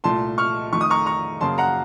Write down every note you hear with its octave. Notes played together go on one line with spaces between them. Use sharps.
C2 A#2 A3 A5 C6
C#6 F6
F2 D#3 A3 C#6
D#6
A#5 C#6
A#5 C#6
F#2 C#3 F#3 A#3 A5 C6
F#5 A#5